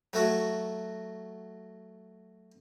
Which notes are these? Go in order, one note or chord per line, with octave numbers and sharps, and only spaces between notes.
F#3 A3 F#4